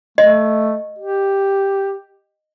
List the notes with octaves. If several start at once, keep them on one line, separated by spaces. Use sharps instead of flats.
A3 D#5
G4